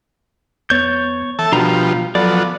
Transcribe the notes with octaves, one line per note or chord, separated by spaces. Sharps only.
F2 B3 C#5 G6 A6
E3 A4 E5 A5
B2 F3 G3 D4 F4 F#4 A#5
F3 F#3 B3 A4 D5